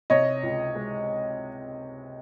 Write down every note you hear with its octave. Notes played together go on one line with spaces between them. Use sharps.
C3 C#5 D#5
C#2
G#3